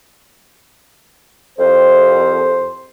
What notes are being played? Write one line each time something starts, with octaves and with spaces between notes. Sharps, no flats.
C2 F2 C5